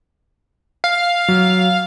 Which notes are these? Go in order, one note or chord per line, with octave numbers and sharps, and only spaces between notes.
F5
F#3